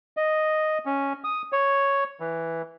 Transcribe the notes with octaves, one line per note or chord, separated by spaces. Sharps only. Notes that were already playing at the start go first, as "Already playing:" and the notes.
D#5
C#4
D#6
C#5
E3